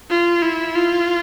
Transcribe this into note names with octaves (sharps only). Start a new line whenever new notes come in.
F4
E4
F4